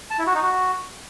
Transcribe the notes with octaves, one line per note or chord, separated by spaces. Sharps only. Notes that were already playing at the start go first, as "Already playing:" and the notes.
A5
E4
F#4
D#4
F#4